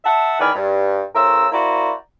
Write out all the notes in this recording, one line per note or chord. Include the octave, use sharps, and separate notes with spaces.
E5 F#5 A5
E2 D#3 D5 G#5 B5 F6
G2
A2 C#3 A#4 C5 E6
A#3 E4 F#4 C5 D5 A#5